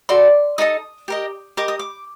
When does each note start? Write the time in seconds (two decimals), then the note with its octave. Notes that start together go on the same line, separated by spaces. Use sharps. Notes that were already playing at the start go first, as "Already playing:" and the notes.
0.09 F#4 A4 D5 C6
0.58 D#4 A4 D#5 D#6
1.08 G4 A#4 D#5
1.57 G4 A#4 D#5 D6
1.68 D#6
1.79 D6